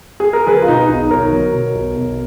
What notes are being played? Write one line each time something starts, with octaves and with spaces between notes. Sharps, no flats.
G#4
A#4
F#3 G#4 B4
F4
B2 D#4
B1 D#4
B1 A#4 C#5
F#3
B2
B1
B1